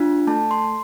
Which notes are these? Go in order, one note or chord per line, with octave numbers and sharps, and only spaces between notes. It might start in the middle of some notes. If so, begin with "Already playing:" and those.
Already playing: D4 F4
A3 A5
C6